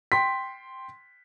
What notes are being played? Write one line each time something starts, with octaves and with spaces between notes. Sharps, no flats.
G5 C6 B6